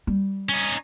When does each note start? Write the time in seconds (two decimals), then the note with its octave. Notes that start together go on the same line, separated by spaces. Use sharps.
0.07 G3
0.49 C#4 D#4